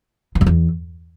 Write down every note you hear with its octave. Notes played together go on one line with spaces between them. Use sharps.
E3
F#2
E2